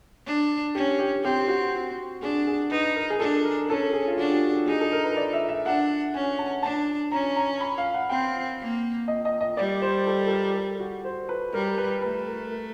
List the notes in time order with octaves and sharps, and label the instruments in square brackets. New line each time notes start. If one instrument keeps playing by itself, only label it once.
[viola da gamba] D4
[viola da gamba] C#4 [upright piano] G4
[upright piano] G4
[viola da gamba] C4 [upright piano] G4
[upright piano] F#4
[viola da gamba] D4 [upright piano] G#4
[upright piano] G#4
[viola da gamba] D#4 [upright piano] B4
[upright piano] A#4
G#4
[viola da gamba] D4 [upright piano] A4
[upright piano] A#4
[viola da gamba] C#4 [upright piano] A4
[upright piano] G#4
F4
[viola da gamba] D4 [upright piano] F#4
[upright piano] G4
F#4
G4
[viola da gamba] D#4 [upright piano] G#4
[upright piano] A4
A#4
B4
D5
E5
E5
[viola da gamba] D4 [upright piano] F#5
[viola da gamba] C#4 [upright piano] G#5
[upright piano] A5
[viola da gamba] D4 [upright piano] A5
[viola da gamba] C#4 [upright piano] A#5
[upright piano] A#5
B5
F5
F#5
[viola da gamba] C4 [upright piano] G5
[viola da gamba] A#3
[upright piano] D#5
D#5
D#5
[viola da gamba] G3 [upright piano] D5
[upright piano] C5
A4
A4
A#4
A4
F#4
C5
B4
[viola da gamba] G3 [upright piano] A#4
[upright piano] B4
[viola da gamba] A3 [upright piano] B4
[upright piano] A#4
A#4